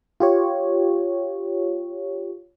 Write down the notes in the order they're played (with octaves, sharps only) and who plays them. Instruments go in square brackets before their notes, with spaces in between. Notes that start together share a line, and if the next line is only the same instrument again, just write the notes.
[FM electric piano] F4 G4 C#5